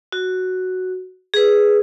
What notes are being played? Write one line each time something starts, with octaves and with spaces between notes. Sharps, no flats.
F#4
G#4 B4